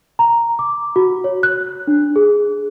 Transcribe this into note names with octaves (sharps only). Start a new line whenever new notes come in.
A#5
D6
F#4
C#5
F#6
D4
G#4